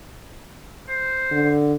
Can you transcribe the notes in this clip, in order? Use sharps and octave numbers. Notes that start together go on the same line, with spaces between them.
C5
D3